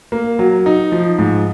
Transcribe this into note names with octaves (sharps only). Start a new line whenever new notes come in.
A#3
F#3
D#4
F3
G#2